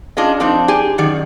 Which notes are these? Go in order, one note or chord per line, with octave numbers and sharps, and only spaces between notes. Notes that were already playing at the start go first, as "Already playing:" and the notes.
C#4 D4 F4 G#4 D#5
F3 C4 D4 D#4
G4 G#4 G#5
F#2 D#3 D5